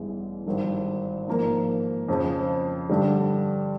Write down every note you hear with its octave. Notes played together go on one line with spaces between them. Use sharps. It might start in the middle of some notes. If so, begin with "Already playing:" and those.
Already playing: A1 G2 E3 G#3 B3
G#1 G2 D#3
G#2 F3 A#3
F2 C#3 F3
G2 D3 G3